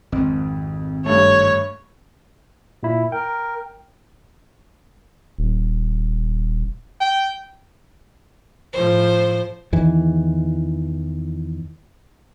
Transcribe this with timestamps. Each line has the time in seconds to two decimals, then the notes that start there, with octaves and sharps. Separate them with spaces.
0.12 G#1 F2
1.06 G2 A3 C#5
2.83 A#2 E4
3.12 A#4 G5
5.38 D#1
7.00 G5
8.73 A2 F3 C5
9.73 E2 D#3 E3